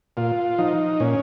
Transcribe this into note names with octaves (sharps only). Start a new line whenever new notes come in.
A#2 F4
F3 D#4
A#2 C#4